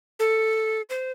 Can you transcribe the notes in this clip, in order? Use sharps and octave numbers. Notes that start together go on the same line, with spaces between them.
A4
C5